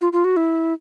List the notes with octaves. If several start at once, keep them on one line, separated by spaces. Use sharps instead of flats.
F4
F4
F#4
E4